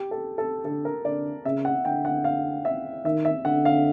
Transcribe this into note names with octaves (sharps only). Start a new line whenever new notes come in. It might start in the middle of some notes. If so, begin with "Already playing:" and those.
Already playing: G4
A4
A4
D3 A4
A#4
D3 D5
C#3 E5
F#5
D3 G5
F#5
F5
E5
D#3 E5
E5
D3 F#5
F5